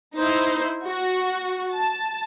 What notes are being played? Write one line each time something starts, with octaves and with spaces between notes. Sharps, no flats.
D#4 E4 C5
F#4
A5